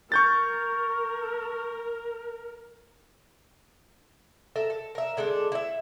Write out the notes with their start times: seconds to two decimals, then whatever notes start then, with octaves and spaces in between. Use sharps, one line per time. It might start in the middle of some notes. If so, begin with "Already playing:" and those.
0.12 A#4 C#6 G6 A6
4.56 A4 A#4 E5
4.70 A4
4.95 A#4 E5
5.17 D3 G#3 D4 A4
5.52 E4 E5